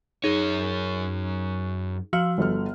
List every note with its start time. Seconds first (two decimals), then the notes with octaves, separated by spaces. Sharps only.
0.24 F#2 D#4 G#4 C#5
2.13 F3 F#4 F5 E6
2.38 G1 A4 F6